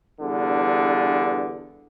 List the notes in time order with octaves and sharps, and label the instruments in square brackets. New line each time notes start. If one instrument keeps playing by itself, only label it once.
[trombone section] E2 G2 D3